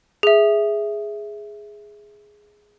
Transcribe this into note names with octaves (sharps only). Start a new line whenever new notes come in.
G#4 E5